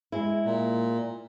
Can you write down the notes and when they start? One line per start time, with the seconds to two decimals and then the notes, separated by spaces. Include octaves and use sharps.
0.12 G#3 E4
0.45 A#2